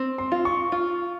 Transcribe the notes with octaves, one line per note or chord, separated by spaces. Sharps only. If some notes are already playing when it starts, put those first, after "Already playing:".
Already playing: C4
C6
F4
C#6
F4